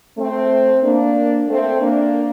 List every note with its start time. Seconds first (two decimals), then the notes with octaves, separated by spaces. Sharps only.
0.18 A3 C4
0.83 A#3 D4
1.48 A3 C4
1.81 A#3 D4